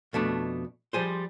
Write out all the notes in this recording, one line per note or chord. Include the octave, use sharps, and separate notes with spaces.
F2 B2 A3 D4
F3 G3 G#4 C5